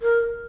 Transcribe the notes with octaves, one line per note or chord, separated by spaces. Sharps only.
A#4